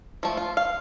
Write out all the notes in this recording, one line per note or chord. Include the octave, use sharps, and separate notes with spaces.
F3 A3
F4
F5